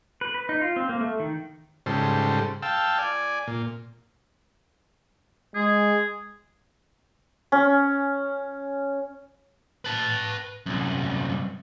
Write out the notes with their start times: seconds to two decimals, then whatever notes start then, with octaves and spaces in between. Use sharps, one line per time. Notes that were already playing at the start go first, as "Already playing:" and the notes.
0.21 B4
0.35 B4
0.49 D#4
0.61 F4
0.76 C4
0.89 A#3
1.01 A3
1.20 D#3
1.86 G#2 C#3 G3 A4 C5
2.62 F5 G5 A5 E6
2.99 D5 G#5
3.47 A#2
5.55 G#3 G#4
7.52 C#4
9.85 B4 A5
10.66 C2 F#2